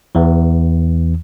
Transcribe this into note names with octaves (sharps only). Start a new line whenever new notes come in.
E2 E3